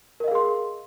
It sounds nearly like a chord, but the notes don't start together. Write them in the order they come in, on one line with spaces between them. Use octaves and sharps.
A#4 D#5 F5 G#4 C6